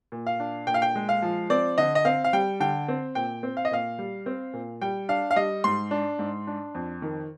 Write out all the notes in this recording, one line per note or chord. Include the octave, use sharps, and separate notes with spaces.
A#2
F5
D4
A#2 G5
F5
G5
G#3
F5
F3
C4 D5
D3 D#5
D#5
C4 F5
F5
G3 G5
D3 G5
C4
A#2 G5
C4
F5
D#5
A#2 F5
G3
C4
A#2
G3 G5
D4 F5
F5
G3 D#5
G#2 C6
D4
G#2
D4
F2
D#3